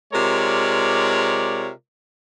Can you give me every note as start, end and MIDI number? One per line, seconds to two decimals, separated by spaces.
0.14 1.71 48
0.14 1.71 56
0.14 1.71 65
0.14 1.71 70
0.14 1.71 73
0.14 1.71 74